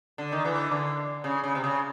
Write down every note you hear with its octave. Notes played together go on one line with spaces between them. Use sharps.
D3
D#3
D3 E3
D3
C#3
C#3
C3
C#3